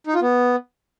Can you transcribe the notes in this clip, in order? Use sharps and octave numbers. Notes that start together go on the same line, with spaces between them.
D#4
F4
B3